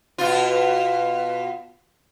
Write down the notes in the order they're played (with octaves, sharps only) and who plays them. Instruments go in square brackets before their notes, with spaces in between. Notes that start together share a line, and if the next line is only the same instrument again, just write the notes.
[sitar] B2 F4